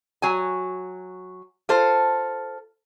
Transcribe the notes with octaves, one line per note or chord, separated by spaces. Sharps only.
F#3 G#5
F4 A4 C5